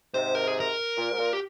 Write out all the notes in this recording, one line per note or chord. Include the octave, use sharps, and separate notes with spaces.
G#2 C3 C5
A#4
G#4
A#4
A#2
G#2
A#2
G4